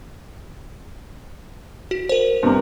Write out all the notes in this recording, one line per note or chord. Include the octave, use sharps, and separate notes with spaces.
F#4
A#4 C5
G2 C3 A#4